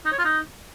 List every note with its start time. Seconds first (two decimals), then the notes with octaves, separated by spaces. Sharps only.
0.06 D#4
0.12 C#5
0.18 F4
0.25 D#4